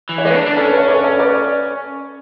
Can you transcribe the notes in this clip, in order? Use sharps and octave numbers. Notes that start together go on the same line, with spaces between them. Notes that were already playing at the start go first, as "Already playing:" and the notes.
E3
C#5
G#3 B4 D5
D4
D4
C#4 A4
B4
C#5
B4 D5
A4 C#5
B4 D5